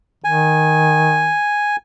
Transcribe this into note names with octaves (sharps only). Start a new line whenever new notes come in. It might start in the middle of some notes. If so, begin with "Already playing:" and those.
D#3 G#5